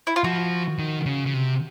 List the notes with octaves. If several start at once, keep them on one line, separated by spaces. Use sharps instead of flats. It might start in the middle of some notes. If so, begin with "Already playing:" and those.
E4
F4
F3 F#4
D#3
C#3
C#3
C3